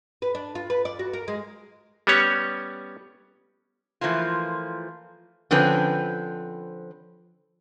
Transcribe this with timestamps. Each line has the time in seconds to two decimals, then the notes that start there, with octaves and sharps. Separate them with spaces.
0.22 B4
0.35 D4
0.55 F4
0.70 B4
0.85 D5
0.99 F#4
1.13 A#4
1.28 G#3
2.07 G3 B3 C#4 C#5
4.01 E3 F3 A3 A#3 F4
5.51 D3 F3 C4 C#4 B4